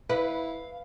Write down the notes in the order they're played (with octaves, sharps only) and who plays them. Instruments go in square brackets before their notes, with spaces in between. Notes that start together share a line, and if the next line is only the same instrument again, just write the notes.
[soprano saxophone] E4 [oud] B4 [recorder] F5